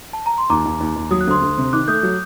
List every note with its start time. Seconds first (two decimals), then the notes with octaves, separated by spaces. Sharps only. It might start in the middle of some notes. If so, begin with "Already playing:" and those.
0.13 A5
0.26 A#5
0.38 C6
0.50 D#2 A#5 D6
0.65 D#2
0.80 D#2
0.96 D#2
1.11 F#3 D#6
1.21 F#6
1.27 D2 C6 D#6
1.42 D2
1.58 C3
1.73 D#3 D6 F#6
1.88 A3 D#6 G6
2.03 F#3